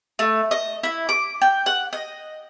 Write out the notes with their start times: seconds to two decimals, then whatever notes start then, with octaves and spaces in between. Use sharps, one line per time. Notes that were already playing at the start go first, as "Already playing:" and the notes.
0.19 A3
0.51 D#5
0.83 E4
1.09 D6
1.41 G5
1.66 F#5
1.93 D#5